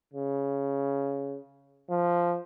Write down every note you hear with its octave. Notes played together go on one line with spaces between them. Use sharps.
C#3
F3